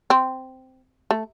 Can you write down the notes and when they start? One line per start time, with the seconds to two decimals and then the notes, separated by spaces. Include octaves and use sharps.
0.10 C4
1.11 A3